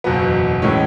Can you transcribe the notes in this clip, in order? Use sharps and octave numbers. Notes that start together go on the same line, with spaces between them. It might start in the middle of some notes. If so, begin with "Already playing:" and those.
F#1 E2 B2 F#3 B3
A2 E3 G#3 C#4